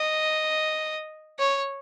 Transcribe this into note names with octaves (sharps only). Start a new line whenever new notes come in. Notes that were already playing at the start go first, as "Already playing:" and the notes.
Already playing: D#5
C#5